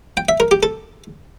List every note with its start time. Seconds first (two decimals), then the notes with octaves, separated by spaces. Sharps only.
0.17 G5
0.29 E5
0.40 A#4
0.51 G4
0.63 A4